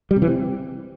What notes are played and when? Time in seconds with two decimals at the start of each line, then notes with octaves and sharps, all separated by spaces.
0.11 G3
0.16 C3
0.22 E3
0.27 C4